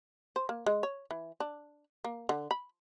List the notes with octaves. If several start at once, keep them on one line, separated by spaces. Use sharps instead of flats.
C5
A#3
G#3
C#5
E3
D4
A#3
D3
B5